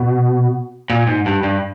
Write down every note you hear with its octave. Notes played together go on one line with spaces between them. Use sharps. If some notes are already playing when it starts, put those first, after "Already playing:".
Already playing: B2
A#2
G#2
G2
G2